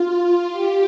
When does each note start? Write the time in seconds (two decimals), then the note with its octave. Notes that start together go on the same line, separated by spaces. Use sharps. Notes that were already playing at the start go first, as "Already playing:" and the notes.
Already playing: F4
0.17 F4
0.51 G4